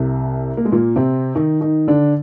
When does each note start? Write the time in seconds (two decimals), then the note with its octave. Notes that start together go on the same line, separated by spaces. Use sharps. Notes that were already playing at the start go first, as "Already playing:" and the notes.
Already playing: C2 C3
0.57 A#3
0.65 G#3
0.72 A#2 A#3
0.96 C3 C4
1.35 D#3 D#4
1.61 D#3 D#4
1.88 D3 D4